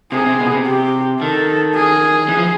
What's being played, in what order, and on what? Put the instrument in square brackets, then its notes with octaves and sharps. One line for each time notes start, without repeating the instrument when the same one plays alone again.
[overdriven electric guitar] C3 [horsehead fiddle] G#4
[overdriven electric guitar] C3
B2
C3
[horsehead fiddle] G4
[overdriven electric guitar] D#3 [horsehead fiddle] A4
[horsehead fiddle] G#4
[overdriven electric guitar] E3
F3